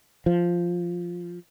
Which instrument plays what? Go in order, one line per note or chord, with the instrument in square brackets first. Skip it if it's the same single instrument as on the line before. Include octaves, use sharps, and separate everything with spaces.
[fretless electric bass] F3